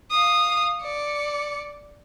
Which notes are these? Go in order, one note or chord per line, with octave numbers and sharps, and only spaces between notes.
F5 D#6
D5 C#7